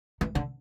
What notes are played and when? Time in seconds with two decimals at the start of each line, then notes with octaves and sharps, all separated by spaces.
0.21 E3
0.35 D3